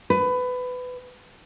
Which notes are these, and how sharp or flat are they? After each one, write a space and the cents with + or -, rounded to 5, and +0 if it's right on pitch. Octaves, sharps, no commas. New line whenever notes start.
B4 +20